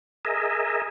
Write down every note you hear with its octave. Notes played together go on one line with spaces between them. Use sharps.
G#4 A#4 D#5 E5